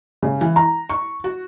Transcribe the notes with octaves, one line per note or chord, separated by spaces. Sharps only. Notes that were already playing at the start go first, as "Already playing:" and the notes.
C#3
E3
A#5
C#6
F#4